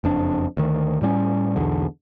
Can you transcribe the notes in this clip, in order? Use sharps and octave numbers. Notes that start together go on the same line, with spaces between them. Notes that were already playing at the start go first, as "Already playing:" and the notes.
F#1 F2 D4
D2 D#3
A2 G3 C4 C#4
B1 E2 D3